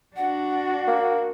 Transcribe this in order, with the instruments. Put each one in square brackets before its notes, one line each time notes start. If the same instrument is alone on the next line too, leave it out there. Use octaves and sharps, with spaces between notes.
[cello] D4 F#4 [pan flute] F#5
[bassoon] A#3